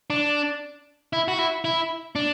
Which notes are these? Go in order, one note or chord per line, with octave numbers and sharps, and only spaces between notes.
D4
E4
F#4
E4
E4
D4